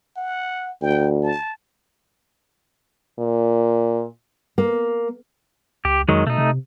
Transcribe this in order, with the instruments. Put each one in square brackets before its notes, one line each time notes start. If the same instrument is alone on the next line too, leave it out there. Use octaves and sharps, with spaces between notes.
[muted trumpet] F#5
[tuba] D2 [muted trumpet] G5
[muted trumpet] A5
[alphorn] A#2
[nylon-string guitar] A#3
[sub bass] C#2 [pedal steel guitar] G4
[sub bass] F2 [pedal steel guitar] D#3 F#3 G#3
[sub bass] B2 [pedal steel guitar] A3 D#4
[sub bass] C3